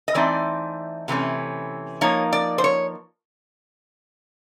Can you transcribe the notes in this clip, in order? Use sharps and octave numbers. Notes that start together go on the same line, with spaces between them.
D#5
E3 A3 C4 D#4 D5
C3 E3 A3 C#4
F3 A#3 D#4 C#5
D5
C5
C#5